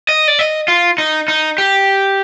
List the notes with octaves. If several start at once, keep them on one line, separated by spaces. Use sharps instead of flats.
D#5
D5
D#5
F4
D#4
D#4
G4